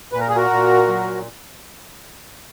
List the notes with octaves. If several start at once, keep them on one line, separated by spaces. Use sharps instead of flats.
A#2 B4
A#4
G#4
F#4 A#4
A#2
F#3